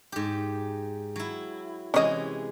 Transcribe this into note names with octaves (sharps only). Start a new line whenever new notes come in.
G#2 G4
F#3 E4
C3 E3 G#3 C#4 D#5